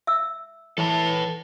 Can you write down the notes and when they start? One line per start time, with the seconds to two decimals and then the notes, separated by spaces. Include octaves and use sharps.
0.07 E5 E6
0.78 E3 A4 C#5 A5